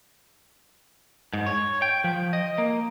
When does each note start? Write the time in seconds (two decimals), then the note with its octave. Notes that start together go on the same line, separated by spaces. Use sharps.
1.33 G#2
1.46 C#5
1.82 G5
2.04 F3
2.33 D#5
2.58 A#3